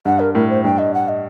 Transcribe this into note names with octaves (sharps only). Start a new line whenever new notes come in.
G2 F#5
A#4
A2 A#4
C5
G2 G5
D#5
F#5
D#5